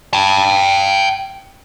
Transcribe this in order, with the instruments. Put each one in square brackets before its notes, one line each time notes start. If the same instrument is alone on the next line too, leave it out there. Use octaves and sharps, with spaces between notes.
[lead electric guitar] G5 A5